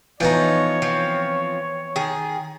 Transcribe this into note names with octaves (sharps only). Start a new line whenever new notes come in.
E3 F3 B3 D#4 C#5
F3 C4
D#3 G#4